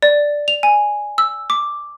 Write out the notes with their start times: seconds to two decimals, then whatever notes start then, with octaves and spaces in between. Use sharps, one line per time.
0.02 D5
0.48 F7
0.63 G#5
1.18 E6
1.50 D6